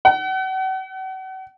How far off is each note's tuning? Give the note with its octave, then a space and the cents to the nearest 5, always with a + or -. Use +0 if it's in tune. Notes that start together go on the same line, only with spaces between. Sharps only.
F#5 +40